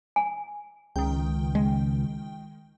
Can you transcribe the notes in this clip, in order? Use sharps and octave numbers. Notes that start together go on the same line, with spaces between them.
G#5
C#2 D#3 G5
G#3